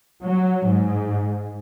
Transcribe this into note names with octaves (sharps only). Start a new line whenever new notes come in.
F#3
G#2